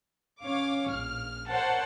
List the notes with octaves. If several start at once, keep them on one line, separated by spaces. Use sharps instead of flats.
C#4 C#5 F5 D6
A#1 F6
A#4 C5 C#5 F#5 G5 A5